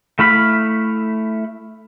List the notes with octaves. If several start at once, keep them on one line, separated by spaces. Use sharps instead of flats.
A3 E4 F5 B5